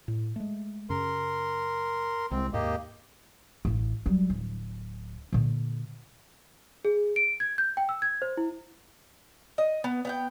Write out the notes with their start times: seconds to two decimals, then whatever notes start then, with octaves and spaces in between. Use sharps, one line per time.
0.08 A2
0.36 G#3 A3
0.90 F#2 C#3 A#4 C6
2.31 C2 G#3 C4
2.53 D#2 G#2 C3 A#3 G4 D#5
3.65 A1 E4
4.06 F#3 G3
4.30 D1
5.33 A#2 D3
6.85 G#4
7.16 D7
7.40 G#6
7.58 G6
7.77 G5
7.89 E6
8.02 G#6
8.22 C5
8.37 E4
9.58 D#5
9.84 B3
10.05 B3 F#5 G5